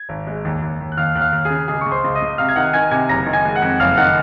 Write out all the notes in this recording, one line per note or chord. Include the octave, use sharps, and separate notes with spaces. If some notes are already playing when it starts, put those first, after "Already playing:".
Already playing: G#6
G#1
G#3
D#2
D#2
D#2
F#6
D#2 F5 F6
D#2 F#6
F5 F6
D#2
C#3 G#4 G#5
C#2 G#4 G#5
C#2 C#6
C5 C6
C#2
D#5 D#6
C#2
C3 F5 F6
G#6
D#3 F#5 F#6
D#3 G#5 G#6
C3 G#5 G#6
F#1 A#5 A#6
D#3
G#5 G#6
G#3
F#5 F#6
F2
F#1 F5 F6
D#3 F#5 F#6